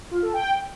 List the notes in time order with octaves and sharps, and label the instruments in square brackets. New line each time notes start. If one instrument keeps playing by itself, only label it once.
[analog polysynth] F4
A4
G5